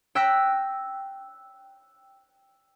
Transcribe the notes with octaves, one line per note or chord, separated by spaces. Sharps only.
G5 E6 F#6 A#6 B6